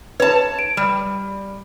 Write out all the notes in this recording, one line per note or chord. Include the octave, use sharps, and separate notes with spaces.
B4 C#5 A5
D7
G3